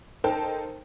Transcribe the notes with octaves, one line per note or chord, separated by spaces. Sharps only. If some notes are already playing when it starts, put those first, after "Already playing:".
D#4 A4 A#4 C5 G5 A5